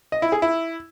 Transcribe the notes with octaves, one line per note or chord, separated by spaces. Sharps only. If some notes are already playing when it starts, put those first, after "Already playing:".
D#5
E4
G#4
E4